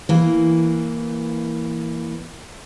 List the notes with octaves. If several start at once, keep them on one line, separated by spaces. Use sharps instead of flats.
E3 A#3